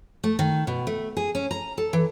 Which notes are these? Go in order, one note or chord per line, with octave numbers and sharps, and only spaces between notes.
A3
D#3
B2
A3
G#4
C#4
A#5
A4
E3